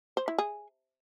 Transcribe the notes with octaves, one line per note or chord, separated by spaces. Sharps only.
C5
E4
G#4